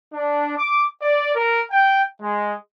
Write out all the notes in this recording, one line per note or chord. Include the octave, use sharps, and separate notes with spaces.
D4
D6
D5
A#4
G5
G#3